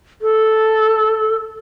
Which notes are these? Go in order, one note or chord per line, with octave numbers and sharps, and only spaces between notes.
A4